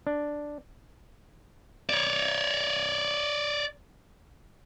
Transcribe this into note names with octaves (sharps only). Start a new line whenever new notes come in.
D4
C#5 D5